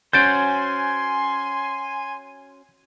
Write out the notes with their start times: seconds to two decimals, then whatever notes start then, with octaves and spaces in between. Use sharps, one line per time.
0.13 C#4 F#4 C5 G#5 C6 G6 A6 D7